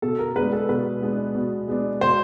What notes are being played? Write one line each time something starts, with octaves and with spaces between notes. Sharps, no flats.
B2 A4
A#4
G#3 B3 D4 B4
A4
B2 B4
G#3 B3 D4
B2
G#3 B3 D4
B2 C5